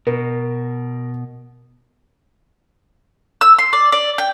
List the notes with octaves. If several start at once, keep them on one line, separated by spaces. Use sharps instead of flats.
B2 A#4
E6
C6
D5
D5
G5